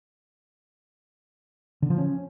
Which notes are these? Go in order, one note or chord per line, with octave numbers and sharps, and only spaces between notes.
D3
F3
C#4